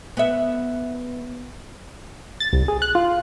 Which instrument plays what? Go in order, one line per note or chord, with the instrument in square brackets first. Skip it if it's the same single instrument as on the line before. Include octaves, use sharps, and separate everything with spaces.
[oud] B3 E5
[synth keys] A6
C2
G#4
F#6
F4